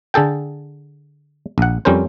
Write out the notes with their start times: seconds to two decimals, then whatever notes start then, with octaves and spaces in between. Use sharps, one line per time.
0.14 D3 G#4 A4 G5
1.58 A#1 F#5
1.85 F2 G3 C#4 A#4 C5